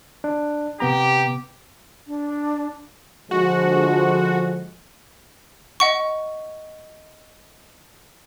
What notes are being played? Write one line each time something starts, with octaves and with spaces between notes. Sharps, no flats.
D4
C3 B3 G4 A#5
D4
D3 F3 G#3 F#4
D#5 F#5 C#6